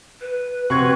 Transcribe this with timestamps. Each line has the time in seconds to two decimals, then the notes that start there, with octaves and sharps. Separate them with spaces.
0.21 B4
0.70 F2 C3 C4 F#4 B4 C#6 G#6